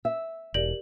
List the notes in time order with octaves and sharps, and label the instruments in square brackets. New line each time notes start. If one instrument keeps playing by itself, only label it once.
[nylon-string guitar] E5
[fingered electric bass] E1 [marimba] G4 A#4 D5 [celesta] F#7